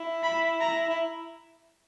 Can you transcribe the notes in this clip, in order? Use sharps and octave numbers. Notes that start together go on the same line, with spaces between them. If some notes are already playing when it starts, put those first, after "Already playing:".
Already playing: E4
B5
A#5
E4